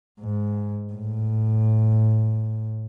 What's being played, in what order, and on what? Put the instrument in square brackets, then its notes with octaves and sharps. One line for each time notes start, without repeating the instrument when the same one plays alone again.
[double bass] G#2
A2